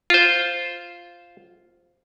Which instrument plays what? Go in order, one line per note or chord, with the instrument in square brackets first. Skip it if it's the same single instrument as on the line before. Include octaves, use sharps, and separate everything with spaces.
[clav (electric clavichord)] F4 C5